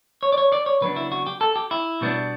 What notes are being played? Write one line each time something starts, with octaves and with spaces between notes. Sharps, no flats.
C#5
D5
C#5
D5
C#5
C#3 F#3 B3 D4 B4
E4
F#4
G4
A4
G4
E4
B2 G3 B3 D4